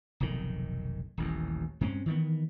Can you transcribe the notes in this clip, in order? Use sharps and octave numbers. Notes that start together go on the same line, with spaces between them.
F1 B1 A2 D#3
D#1 A1 D#2
G2 G#3 C4 C#4
D#3 E3 B3